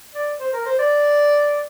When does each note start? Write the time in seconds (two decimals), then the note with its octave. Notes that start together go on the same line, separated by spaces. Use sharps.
0.15 D5
0.40 C5
0.53 A#4
0.66 C5
0.79 D5